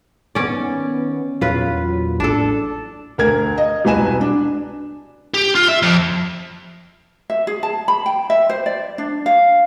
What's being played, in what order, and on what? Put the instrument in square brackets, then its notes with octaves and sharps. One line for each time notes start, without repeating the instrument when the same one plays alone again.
[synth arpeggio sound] D#3 B3 [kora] C#4 D5
[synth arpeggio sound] E2 A#2 F#3 [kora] F4 B4
[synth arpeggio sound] A1 D5 [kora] D4 A4
[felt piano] D2 A#4 G#6
D#5
E1 C2 F#4 B4 G#5 E7
D4
[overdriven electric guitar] G4
F4
E5
F2
[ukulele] E5
G#4
A5
B5
G5
E5
C5
D5
D4
F5